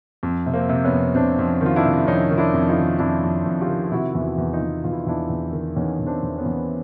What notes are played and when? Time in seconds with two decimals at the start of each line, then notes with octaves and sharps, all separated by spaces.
0.23 F2
0.46 C3
0.53 A#3 C4
0.69 C3
0.85 B3 C#4
0.92 F2
1.15 C3 C4 D4
1.39 F2
1.61 D#3 F4
1.76 D4 E4
1.85 C3
2.07 F2 C#4 D#4
2.31 D#3
2.38 D4 E4
2.54 F2
2.69 D#4 F4
2.77 D#3
2.99 F2 D4 E4
3.23 F2
3.46 F2
3.61 F4 G4
3.69 D#3
3.84 F4
3.92 C3 E4 F#4
4.15 E2
4.22 E4 F#4
4.38 E2
4.53 D#4 F4
4.61 E2
4.84 E2 F4
4.92 E4
5.00 D#4
5.07 E2 D4 E4
5.30 E2
5.53 D#3
5.76 E2 C#4 D#4
6.00 E2
6.07 C4 D4
6.23 E2
6.38 B3 C#4
6.46 E2